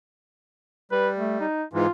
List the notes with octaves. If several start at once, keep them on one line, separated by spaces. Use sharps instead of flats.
G3 B4
A3
D#4
G#2 E3 F4